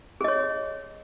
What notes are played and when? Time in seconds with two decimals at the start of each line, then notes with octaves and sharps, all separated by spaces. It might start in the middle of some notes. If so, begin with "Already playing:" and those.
0.21 G#4
0.24 D#5
0.28 C#5